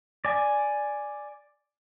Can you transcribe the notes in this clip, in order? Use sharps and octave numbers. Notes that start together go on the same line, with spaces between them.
D5 G#5